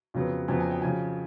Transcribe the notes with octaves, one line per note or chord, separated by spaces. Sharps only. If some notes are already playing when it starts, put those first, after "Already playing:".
F2 C#3 F#3 B3
F2 C#3 F#3 B3 G#5
G#5
G5
F2 C#3 F#3 G#5